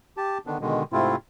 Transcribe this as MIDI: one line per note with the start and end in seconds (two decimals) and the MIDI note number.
0.17 0.38 67
0.17 0.38 81
0.46 0.58 50
0.46 0.58 51
0.46 0.58 59
0.46 0.58 62
0.61 0.83 47
0.61 0.83 50
0.61 0.83 51
0.61 0.83 56
0.92 1.16 44
0.92 1.16 48
0.92 1.16 57
0.92 1.16 60
0.92 1.16 64
0.92 1.16 65